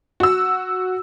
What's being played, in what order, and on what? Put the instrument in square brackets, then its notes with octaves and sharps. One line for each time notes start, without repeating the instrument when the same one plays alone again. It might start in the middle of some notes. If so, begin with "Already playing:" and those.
[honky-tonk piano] F#4 E6